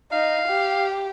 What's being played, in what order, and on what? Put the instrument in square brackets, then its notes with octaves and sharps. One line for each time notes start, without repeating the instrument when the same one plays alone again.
[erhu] D#4 [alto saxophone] F5
[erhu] G4